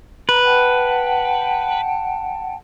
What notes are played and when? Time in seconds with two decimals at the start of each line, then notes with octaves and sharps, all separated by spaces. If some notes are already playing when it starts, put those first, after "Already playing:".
0.29 B4 A#5
0.43 F#5 G5 A5